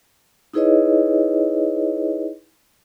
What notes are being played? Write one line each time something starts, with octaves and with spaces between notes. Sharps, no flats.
D#4 E4 G#4 B4 C#5 D#5